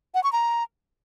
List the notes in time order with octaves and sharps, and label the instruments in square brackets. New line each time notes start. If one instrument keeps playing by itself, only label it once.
[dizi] F#5
C#6
A#5